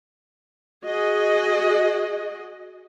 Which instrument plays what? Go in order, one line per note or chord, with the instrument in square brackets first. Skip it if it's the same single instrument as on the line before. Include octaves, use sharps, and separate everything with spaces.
[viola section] F#4 G#4 D#5